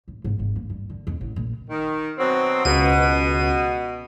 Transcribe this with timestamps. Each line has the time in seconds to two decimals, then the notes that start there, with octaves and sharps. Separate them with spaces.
0.08 A1
0.24 G#1
0.39 G#1
0.56 A#3
0.70 G2
0.89 D3
1.07 F2
1.21 A1
1.36 A#1
1.70 D#3
2.18 B2 F#3 C4
2.65 C#2 B2 D#7